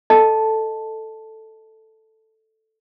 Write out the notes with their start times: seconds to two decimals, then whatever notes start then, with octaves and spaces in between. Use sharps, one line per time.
0.10 A4 D#5 A5